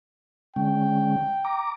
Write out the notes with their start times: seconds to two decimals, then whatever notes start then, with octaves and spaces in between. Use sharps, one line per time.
0.56 D3 G#3 C#4 G5
1.45 A#5 D6